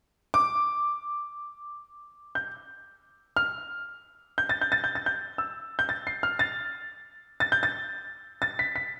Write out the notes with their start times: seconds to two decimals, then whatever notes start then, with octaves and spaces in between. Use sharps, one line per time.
0.34 D6
2.35 G6
3.37 F6
4.38 G6
4.49 A6
4.61 G6
4.72 A6
4.84 G6
4.95 A6
5.06 G6
5.38 E6
5.79 G6
5.89 A6
6.07 C7
6.23 F6
6.39 A6
7.40 A6
7.52 G6
7.63 A6
8.42 A6
8.59 B6
8.76 B6